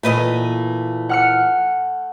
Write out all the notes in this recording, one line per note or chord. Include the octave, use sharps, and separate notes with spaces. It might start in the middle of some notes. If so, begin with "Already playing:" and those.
A#2 E3 A3 B4 D#5
F#5 F6 C#7